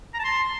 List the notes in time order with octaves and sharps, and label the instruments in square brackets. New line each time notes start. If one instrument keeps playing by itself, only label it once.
[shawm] A#5
A5
C6